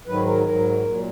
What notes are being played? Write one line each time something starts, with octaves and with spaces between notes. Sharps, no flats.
G#2 D#3 F#3 B4
A#4
G#2 F#3 A#4
A#2 F#3